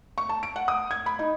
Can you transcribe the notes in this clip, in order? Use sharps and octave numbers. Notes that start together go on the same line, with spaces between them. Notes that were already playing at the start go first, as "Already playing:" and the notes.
C#6
A5
D7
F#5
D#6
G#6
B5
D#4